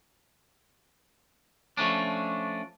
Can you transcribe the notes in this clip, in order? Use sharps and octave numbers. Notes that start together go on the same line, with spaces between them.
F3 A3 C#4 D4